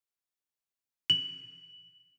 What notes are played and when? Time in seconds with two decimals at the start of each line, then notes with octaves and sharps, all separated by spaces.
1.10 F#7